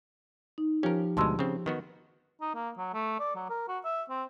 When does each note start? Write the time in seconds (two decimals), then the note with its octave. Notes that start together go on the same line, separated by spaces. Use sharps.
0.58 D#4
0.83 F3 C#4 G4 A#4
1.17 D2 B2 G#3 A5 C6 E6
1.39 C#3 C4
1.66 D#3 B3 F#4
2.41 D#4
2.55 A#3
2.78 F#3
2.94 A3
3.20 D5
3.36 F#3
3.50 A#4
3.69 F#4
3.85 E5
4.10 C4